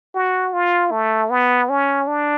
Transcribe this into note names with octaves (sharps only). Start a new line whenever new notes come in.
F#4
F4
A3
B3
C#4
D4